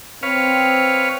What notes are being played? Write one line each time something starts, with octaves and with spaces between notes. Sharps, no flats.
C4 B4 C#5 F5